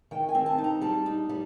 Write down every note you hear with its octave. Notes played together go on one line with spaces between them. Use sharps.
D#3 G5
G#5
C4
A5
D#4
A#5
G3 A5
D#4
G3